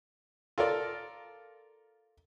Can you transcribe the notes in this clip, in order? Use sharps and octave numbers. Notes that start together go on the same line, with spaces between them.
F4 A4 A#4 D5